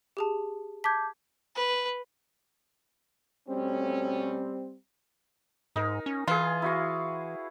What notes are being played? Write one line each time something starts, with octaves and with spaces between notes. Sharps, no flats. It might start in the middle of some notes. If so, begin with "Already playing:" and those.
G4 G#4 A5
A5 D6 G6 G#6 B6
B4
B2 G3 A3 C4 C#4
G#2 D#4 A#4
C#4
E3 F4 G#4 B4
E4 F#4 F5